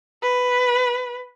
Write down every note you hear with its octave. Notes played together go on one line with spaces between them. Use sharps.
B4